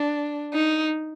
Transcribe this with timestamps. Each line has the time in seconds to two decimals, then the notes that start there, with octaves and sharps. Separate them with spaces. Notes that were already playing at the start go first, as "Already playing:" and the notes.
Already playing: D4
0.54 D#4